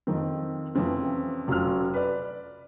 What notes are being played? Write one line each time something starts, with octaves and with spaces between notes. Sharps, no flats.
F2 D#3 C4
F2 C3 E3 C4 C#4
F1 F#3 C#4 F4 E6 F6
B4 D5